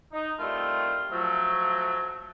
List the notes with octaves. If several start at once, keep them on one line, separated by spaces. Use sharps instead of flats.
D#4
D#3 G3 A3 C4 E4 F4
F3 F#3 A3